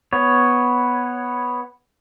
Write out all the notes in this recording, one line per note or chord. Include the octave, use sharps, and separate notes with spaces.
B3 C#5